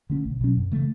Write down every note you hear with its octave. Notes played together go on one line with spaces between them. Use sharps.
D3 A3 C#4
B1
B2 F#3 C#4
F#2
C#3 E3 A3